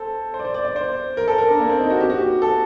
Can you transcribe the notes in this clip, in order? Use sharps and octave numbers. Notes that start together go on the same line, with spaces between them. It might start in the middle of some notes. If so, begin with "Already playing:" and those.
Already playing: A4 C5
C5
D5
C5
D5
D5
C5
A#4
A4
A#4
D4
A#3
C4
D#4
F#4
G4
F#4
G4
A4